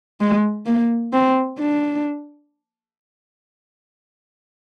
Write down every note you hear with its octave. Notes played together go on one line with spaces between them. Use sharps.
G#3
A#3
C4
D4